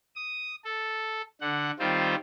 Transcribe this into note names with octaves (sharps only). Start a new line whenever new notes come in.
D#6
A4
D3 F#5
D#3 G3 C4 F4 C5